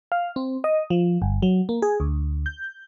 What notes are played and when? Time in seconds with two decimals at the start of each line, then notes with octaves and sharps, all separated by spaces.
0.12 F5
0.36 C4
0.64 D#5
0.90 F3
1.22 G1
1.42 F#3
1.69 A#3
1.82 G#4
2.00 D2
2.46 G6